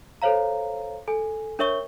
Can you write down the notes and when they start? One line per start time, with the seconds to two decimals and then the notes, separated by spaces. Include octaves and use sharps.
0.22 A4 C5 C#5 F5 A#5
1.08 A4 G#5
1.59 D4 A#4 C#5 E5 C#6 G7